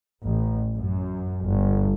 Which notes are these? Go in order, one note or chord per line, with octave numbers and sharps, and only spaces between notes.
A1
F#2
G1